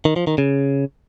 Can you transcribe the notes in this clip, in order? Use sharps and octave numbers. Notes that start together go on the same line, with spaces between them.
D#3
F3
D#3
C#3